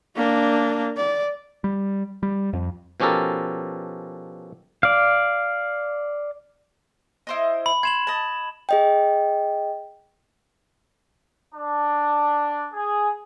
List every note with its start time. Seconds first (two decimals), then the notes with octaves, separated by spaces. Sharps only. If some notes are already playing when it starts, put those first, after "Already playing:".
0.16 A#3 D4
0.97 D5
1.64 G3
2.23 G3
2.53 F2
3.00 B2 F3 C#4 G4 A4 A#4
4.83 D5 F5
7.27 E4 C5 D#5
7.66 B5
7.83 C6 G#6 E7 F#7
8.07 D#5 A5
8.69 G#4 D#5 G5
11.54 D4
12.72 G#4